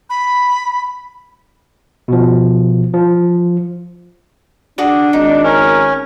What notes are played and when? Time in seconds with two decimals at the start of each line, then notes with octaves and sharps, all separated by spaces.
0.10 B5
2.08 B2 F3
2.94 F3
4.78 D4 F#4 G#4 D5
5.13 G#1 D#4
5.44 C#4 A#4